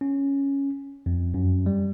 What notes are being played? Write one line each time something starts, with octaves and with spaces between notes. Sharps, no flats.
C#4
F2
F#2
G3